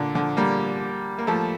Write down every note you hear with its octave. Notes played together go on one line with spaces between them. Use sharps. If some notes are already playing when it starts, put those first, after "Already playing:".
Already playing: A#2 D3
D3 F3
G3 A#3
A#3
F3 A3